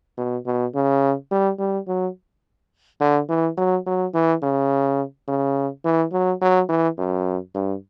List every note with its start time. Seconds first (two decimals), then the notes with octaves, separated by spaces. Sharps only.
0.17 B2
0.46 B2
0.75 C#3
1.31 G3
1.59 G3
1.88 F#3
3.01 D3
3.29 E3
3.57 F#3
3.86 F#3
4.14 E3
4.43 C#3
5.28 C#3
5.85 E3
6.12 F#3
6.41 F#3
6.69 E3
6.98 F#2
7.55 G2